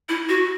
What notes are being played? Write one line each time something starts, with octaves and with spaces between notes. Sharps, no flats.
E4
F#4